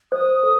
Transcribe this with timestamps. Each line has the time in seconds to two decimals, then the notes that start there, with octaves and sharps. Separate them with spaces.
0.12 C5 D#6
0.43 A4